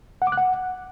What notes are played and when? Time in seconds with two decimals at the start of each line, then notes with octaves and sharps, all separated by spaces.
0.22 F#5
0.27 D6
0.32 F#6
0.38 F#5